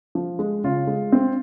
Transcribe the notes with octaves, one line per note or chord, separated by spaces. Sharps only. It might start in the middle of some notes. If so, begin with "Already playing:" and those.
F3
G#3
C#3 F4
G#3
C4